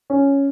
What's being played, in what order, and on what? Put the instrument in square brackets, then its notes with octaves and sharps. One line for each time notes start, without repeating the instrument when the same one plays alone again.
[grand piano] C#4